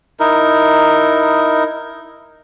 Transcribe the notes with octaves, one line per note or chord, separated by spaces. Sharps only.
D#4 E4 A#4